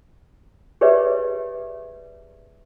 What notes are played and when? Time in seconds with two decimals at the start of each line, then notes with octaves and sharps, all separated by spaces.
0.81 G4 G#4 B4 C#5 D5 E5